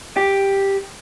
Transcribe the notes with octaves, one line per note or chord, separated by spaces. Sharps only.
G4